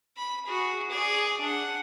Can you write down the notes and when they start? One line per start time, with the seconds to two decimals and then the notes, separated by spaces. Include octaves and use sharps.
0.17 B5
0.46 F#4 G#4
0.90 G#4 D5
1.41 D4 F#5